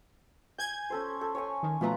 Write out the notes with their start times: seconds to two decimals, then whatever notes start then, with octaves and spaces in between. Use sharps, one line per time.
0.58 G#5 G6 G#6
0.90 C#4 A4 C5
1.21 A4
1.35 C#5 G#5 C#6
1.63 D#3
1.81 B2 F3 A3 F4 B4 A#5